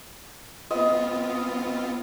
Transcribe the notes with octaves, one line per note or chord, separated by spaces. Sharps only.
B3 C4 F4 D#5